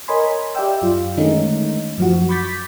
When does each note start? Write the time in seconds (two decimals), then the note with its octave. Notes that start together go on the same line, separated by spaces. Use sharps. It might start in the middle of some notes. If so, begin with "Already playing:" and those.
0.08 A#4 C#5 D#5 G#5 B5 C6
0.55 G4 D5 E5 F5 G5 E6
0.82 F#2 F4
1.17 D3 D#3 G#3 A3 C#4 D#4
1.98 F#2 F3 F#4
2.29 B5 C#6 D6 G6 A6 B6